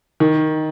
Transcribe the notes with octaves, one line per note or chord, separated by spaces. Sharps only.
D#3